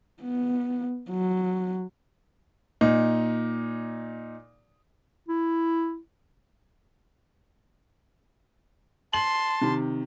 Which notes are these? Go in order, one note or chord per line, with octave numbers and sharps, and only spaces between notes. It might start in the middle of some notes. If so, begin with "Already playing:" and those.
B3
F#3
A#2 D#4
E4
A5 C6 F#7
C3 D#3